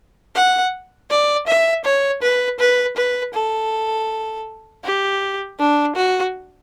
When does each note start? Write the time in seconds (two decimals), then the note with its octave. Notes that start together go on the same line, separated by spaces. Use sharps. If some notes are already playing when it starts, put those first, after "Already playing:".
0.35 F#5
1.10 D5
1.47 E5
1.85 C#5
2.22 B4
2.60 B4
2.97 B4
3.34 A4
4.84 G4
5.59 D4
5.96 F#4